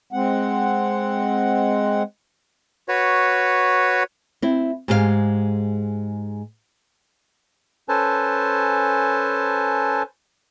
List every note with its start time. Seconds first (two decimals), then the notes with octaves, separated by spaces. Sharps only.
0.13 G#3 C4 F#5
2.88 F#4 B4 C#5
4.42 C4 E4
4.88 G#2 G#3 G4 A#4 F5
7.89 C#4 A4 B4 C5 G#5 A5